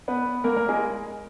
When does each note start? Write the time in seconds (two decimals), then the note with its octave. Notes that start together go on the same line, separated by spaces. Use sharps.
0.08 B3 B4
0.44 A#3 A#4
0.56 A#3 A#4
0.68 G#3 G#4